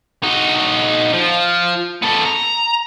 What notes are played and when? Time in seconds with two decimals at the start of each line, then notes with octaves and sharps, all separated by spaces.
0.23 D#4 F#4
1.13 F3
2.02 B3 A4
2.26 A#5